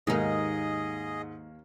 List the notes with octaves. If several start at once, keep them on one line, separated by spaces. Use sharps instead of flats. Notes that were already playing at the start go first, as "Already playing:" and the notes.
D#2 G#2 G#3 A#3 D#4 G#4 D#5